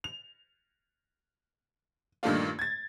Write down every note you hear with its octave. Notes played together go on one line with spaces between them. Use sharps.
F7
G2 A#2 D#3 A3 D4 F4
G#6 A6